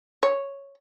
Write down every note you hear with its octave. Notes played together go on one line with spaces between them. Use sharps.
C#5